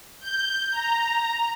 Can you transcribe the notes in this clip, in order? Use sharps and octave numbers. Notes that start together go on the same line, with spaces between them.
G6
A#5